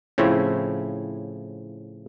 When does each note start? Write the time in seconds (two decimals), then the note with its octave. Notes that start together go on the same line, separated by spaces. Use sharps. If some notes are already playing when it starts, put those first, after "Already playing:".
0.18 A2 C#3 F3 C4 E4 C#5